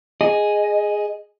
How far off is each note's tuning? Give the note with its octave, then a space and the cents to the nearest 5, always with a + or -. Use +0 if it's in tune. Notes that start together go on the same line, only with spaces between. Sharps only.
G#4 +0 D#5 +0